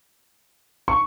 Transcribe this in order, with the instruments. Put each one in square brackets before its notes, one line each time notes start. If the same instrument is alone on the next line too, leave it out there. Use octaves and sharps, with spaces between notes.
[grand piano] C#6